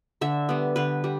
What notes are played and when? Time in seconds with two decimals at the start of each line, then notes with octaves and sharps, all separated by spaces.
0.21 D3 E5
0.49 G3 B3
0.76 D3 B4
1.04 G3